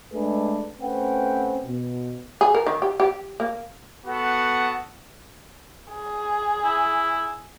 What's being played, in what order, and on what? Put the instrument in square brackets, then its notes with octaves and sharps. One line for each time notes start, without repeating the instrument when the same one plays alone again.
[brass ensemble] G#3 A3 D4 G#4 B4
A3 C4 C#4 B4 F#5 G5
B2
[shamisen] G#4
A#4
D#3
G4
G4
A#3
[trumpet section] B3 F#4 A4 F#5
[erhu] G#4
[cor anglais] E4